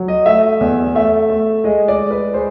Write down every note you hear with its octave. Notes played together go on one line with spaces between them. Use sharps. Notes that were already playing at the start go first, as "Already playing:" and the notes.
Already playing: F#3
D#5
A3 E5
E2
A3 E5
A3
G#3 D#5
D5
G#3
B4
G#3 C5